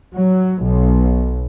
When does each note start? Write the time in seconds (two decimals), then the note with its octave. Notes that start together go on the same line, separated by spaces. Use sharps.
0.15 F#3
0.64 B1